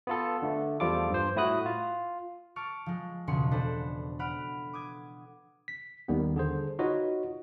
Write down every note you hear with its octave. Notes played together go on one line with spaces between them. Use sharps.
B3 F4 A4
D3 A3
E2 F3 G3 F4 A4 D6
G2 C5
A2 E4 F#4 D#6 F#6
F4
A5 C#6 D6 F6 D7
F3 G#3
E1 C#2 B2 G#4 C6 C#7
D4 A4 B4 C5
F#5 B5 F6 D7
D6 D#6 G#6
B6
D#2 D#3 G3 A#3 B3
D3 G#4 C5
D#4 F4 F#4 B4 C#5 D#5